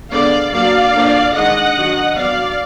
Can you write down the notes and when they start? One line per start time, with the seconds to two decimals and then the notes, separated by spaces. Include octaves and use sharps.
0.11 D3 G#3 B3 D4 D5 F5
0.52 F#3 A#3 D4 D5 F5
0.93 D3 F3 A#3 D4
1.34 D#3 G#3 D4 D#5 F#5
1.76 D#3 F#3 D4
2.16 F#3 B3 D4 D5 F5